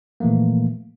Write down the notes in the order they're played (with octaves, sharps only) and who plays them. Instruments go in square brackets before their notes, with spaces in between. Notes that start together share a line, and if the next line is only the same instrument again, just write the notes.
[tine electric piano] A#2 E3 F3 A3 A#3